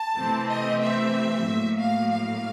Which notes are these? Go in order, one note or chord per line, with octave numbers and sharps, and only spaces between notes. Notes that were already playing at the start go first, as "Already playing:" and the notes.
Already playing: A5
C3 E3 A3 C4
D#5
E5
A2 F#3 A#3
F5
F5